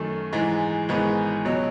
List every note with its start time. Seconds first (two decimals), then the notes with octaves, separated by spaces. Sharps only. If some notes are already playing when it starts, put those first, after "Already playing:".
Already playing: F#2 D#3 A3
0.33 G#2 E3 G#3
0.89 G#1 G#2 E3 G#3 B3
1.45 C#2 B2 F#3